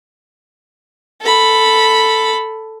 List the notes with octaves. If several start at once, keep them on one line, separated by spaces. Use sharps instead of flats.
A4 B5